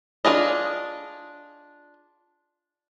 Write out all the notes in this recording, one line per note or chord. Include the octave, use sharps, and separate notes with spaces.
D4 F4 G#4 D#5